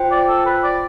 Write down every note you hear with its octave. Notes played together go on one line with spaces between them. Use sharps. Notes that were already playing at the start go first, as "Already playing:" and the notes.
Already playing: F4 C5 G5
D5
A4
B4
D5